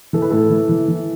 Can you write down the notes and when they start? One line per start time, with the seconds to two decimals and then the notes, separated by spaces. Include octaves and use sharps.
0.13 E3 A4
0.22 B4
0.31 A2 A4
0.50 E3
0.69 E3
0.88 E3